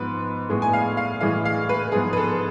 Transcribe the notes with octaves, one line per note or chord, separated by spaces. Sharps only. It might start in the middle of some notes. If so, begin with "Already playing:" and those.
Already playing: G#2 F3 B3 B4
A2 G#3 B3
G#5
F5
F5
A2 E3 G#3 F5
F5
B4
G#2 F3 B3 G#4
B4
A4